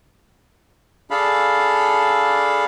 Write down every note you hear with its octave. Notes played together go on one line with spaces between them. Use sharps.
D4 G#4 A4 F5 B5